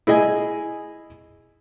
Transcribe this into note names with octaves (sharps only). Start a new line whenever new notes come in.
E4 G#4 D#5 G#5